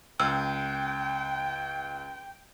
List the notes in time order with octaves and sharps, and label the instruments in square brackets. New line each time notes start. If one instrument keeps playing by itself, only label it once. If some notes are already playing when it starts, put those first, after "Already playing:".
[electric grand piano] C#2 [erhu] G5 [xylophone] E6